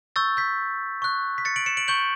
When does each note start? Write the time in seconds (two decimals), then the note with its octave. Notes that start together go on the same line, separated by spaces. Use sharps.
0.16 C#6 E6 G6 A6
0.37 G6 B6
1.02 C#6 F#6
1.38 B6
1.45 A6 C#7
1.56 D7 F#7
1.66 C#7 E7
1.77 D7 F#7
1.88 C#6 G6 D7 F#7